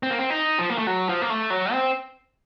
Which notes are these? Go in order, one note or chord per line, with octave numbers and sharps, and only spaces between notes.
C4
A#3
C4
D#4
F3
A#3
A3
F#3
F3
A#3
A3
F#3
C4